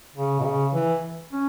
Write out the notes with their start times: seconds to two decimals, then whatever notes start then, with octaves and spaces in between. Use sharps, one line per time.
0.16 C#3
0.40 B2
0.45 C#3
0.74 E3
1.32 C#4